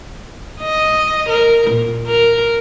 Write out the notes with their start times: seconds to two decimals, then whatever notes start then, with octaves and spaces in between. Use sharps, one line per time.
0.60 D#5
1.29 A#4
1.70 A#2
2.07 A#4